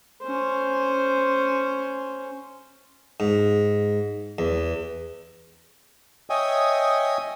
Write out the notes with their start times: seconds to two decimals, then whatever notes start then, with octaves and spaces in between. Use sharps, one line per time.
0.23 C#4 C5
3.20 G#2
4.39 E2
6.30 C#5 D#5 E5 G5 G#5 D#6